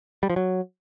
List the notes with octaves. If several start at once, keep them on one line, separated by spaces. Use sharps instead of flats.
G3
F3
F#3